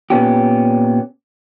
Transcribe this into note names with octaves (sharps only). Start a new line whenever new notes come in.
A#2 B3 C#4 G4